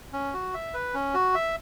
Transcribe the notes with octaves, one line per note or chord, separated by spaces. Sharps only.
C#4
F#4
E5
B4
C#4
F#4
E5